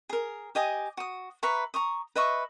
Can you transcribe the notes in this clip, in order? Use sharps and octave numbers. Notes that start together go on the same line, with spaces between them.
G#4 A#4
G4 D#5 G#5 D#6
F#4 D#6
B4 E5 A#5 C#6
A#5 C#6 D#6
B4 D#5 E5 C#6